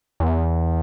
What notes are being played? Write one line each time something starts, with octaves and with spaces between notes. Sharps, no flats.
E2